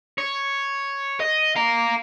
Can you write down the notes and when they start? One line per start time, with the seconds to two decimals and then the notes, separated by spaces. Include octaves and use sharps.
0.18 C#5
1.20 D#5
1.56 F5 A#5